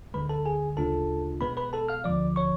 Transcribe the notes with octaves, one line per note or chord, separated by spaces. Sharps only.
D2 D3 G#3 B4 B5
A4 A5
G#4 G#5
D2 C#3 G#3 D4 F4 A4 A5
B2 G#3 B3 B4 B5
B4 B5
A4 A5
F5 F6
D2 D3 F3 D5 D6
C#5 C#6